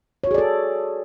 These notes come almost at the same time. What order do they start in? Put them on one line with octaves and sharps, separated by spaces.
C#5 F#4 G#4 D5 A4